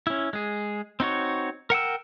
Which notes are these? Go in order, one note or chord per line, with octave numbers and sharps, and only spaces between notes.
C#4 E4
G#3 G#4
C4 D#4 F#4 C#5
A#4 F#5 G5 E6